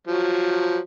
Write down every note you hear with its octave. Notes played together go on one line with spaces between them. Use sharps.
F3 F#3